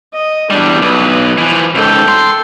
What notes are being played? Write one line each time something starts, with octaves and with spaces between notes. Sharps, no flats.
D#5
E2 G3 D4
B1 B4
E3 F3
C#2 G#2 A4 G5
C6